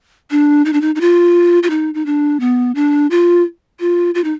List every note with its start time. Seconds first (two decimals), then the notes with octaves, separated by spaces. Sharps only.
0.31 D4
0.65 D#4
0.73 D4
0.81 D#4
0.95 D#4
1.01 F4
1.63 F4
1.70 D#4
1.94 D#4
2.06 D4
2.40 B3
2.75 D4
3.10 F4
3.80 F4
4.15 F4
4.24 D#4